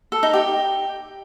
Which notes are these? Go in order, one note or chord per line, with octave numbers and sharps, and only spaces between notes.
A4
D#4
G4